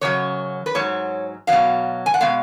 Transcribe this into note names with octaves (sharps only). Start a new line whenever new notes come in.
F#2 C#3 F#3 C#5
B4
G#2 F#3 C#5
B2 F#3 F5
G#5
F#5
B2 G#3 F5